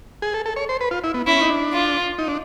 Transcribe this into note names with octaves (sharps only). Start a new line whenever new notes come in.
G#4
A4
A4
C#5
C5
B4
F4
E4
B3
C#4 E4
D#4
D4
F4
D#4
D4